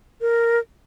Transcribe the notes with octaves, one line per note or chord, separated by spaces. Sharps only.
A#4